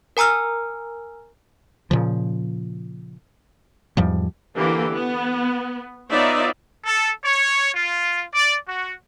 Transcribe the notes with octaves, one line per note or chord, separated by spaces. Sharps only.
A#4 G#5 A#5 E6 F6
A#2 C#3 F3
E2 G#2 F3 G3
D3 E3 A#3 G4
B3
B3 D#4 F4 C#5 D5 E5
A4
C#5
F4
D5
F#4